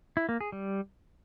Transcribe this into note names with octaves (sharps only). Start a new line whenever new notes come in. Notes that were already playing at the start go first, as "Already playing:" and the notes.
E4
A#3
G#4
G3